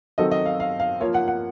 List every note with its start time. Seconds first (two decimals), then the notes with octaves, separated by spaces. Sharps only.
0.18 D#3 F#3 C4 F#4 A4 D#5
0.31 D#5
0.46 F5
0.60 F5
0.80 F5
1.00 F3 A#3 F4 C#5
1.14 F#5
1.28 F#5